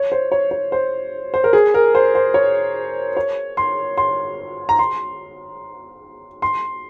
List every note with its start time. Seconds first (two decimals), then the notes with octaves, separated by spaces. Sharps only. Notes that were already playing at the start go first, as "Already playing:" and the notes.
Already playing: C#5
0.12 C5
0.32 C#5
0.51 C#5
0.72 C5
1.34 C5
1.44 A#4
1.53 G#4
1.74 A#4
1.95 C5
2.15 C5
2.34 C#5
3.17 C#5
3.57 C6
3.98 C6
4.69 A#5
4.79 C6
6.42 C6